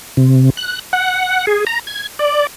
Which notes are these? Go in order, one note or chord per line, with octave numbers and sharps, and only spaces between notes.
C3
F#6
F#5
G#4
A#5
G#6
D5